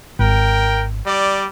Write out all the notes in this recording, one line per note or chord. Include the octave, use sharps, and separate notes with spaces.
G#1 A#4 G5
G3 D5